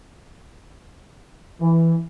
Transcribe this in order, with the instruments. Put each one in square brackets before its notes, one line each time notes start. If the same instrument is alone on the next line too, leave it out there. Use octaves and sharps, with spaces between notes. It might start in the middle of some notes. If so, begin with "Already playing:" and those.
[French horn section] E3